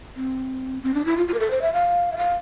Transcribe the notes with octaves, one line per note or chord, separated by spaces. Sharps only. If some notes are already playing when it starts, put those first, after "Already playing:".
C4
C4
D4
E4
F4
F4
A#4
A4
C5
E5
F5
E5
F5